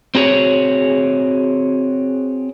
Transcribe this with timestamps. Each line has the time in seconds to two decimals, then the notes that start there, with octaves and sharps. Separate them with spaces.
0.15 C4 F#4 G#4 C#5